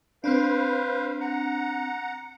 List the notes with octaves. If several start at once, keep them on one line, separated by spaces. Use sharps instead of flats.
C4 D4 B4 C5 F5
F#5 A#5